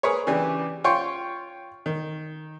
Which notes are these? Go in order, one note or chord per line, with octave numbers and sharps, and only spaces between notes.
G#4 A#4 B4 C#5
C#3 E3 D4 G4
F4 C#5 G5 C6 C#6
D#3